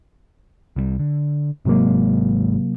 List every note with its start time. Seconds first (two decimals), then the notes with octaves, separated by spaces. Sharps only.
0.76 C2 E3 G3
0.99 D3
1.65 G#1 C3 F#3 G#3 A#3